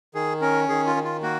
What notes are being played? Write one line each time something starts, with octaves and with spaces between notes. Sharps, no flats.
D#3 G#4
C#4 A#4
D#3 G#4
F4
D#3
F4
A#3 F#4